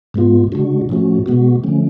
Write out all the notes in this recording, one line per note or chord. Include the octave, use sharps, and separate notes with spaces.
G#2 G#3 B3 F4
C#3 G#3 D4 F#4
A2 F3 A3 C#4 F#4
B2 G#3 B3 F#4
D3 F3 A3 C#4